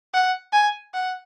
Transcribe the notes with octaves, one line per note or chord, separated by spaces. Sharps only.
F#5
G#5
F#5